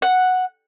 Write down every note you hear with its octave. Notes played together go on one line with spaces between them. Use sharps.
F#5